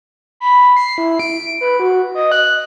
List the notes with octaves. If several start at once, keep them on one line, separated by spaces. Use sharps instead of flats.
B5
C7
E4
D7
B4
F#4
D#5
F#6